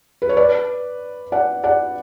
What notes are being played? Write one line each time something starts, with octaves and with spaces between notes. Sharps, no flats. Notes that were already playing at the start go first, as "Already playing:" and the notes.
B4
C#5
B4 D5
D5 F#5
D5 F#5